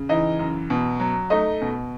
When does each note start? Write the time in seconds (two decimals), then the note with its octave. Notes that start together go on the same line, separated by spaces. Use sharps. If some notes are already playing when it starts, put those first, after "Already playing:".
Already playing: C#3
0.09 E3 D#4 D#5
0.39 F#2
0.70 B2
1.00 F#3
1.30 A3 D#4 D#5
1.62 B2